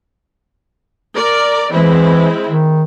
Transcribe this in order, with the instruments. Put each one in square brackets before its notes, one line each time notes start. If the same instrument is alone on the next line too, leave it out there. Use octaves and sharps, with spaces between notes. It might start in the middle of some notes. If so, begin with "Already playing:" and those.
[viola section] A#4 D5
[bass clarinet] E3 [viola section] G#3 C4 E4
[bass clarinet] D#3